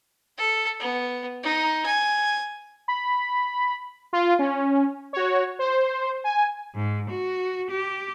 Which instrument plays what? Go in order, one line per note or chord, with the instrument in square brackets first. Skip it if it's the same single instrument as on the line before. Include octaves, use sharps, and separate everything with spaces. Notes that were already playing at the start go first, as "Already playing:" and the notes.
[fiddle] A4
B3
D#4
G#5
[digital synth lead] B5
[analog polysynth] F4
C#4
F#4 C#5
C5
G#5
[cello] G#2
F#4
G4